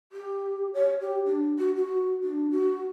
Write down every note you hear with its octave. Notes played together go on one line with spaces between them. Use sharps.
G4
C#5
G4
D4
F#4
F#4
D4
F#4